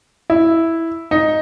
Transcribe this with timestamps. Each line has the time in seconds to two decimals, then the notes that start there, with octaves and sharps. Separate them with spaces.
0.30 E4
1.11 D#4